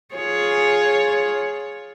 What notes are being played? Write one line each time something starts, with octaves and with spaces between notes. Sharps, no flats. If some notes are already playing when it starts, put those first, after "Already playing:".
F4 G#4 C#5